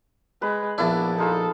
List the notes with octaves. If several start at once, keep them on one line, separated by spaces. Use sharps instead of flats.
G#3 B4
A#1 B3 D4 E4 A5
D#4 F4 G#4 A4